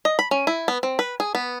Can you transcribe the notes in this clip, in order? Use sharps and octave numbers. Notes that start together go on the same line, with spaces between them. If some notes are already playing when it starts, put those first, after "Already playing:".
D#5
B5
C#4
E4
B3
C4
B4
G#4
B3